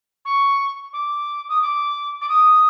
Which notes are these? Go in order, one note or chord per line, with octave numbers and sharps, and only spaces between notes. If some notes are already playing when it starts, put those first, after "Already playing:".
C#6
D6
D#6
D6
D6
D#6